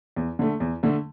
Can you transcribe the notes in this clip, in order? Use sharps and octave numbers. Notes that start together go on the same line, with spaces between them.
E2
D3 A3
E2
D3 A3